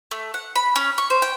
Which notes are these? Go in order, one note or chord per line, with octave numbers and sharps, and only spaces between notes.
A3
F#5
B5
C#4
C#6
C5
G5